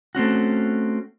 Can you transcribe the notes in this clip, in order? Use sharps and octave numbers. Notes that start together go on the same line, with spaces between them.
A3 C4 C#4 F#4